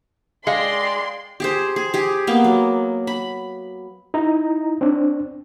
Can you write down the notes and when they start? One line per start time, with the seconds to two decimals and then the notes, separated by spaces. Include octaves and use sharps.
0.47 G#3 D5 F5 G5 C6
1.40 G4 G#4 C5
1.76 G#4
1.94 G4 G#4
2.27 A#3 B3
2.44 F#3
3.07 B5
4.14 D#4 E4 A#5
4.81 C4 D4